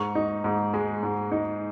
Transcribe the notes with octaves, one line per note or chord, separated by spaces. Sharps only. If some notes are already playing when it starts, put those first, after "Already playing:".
Already playing: G#2 C#6
D#4
G#2
G#3
G#2
D#4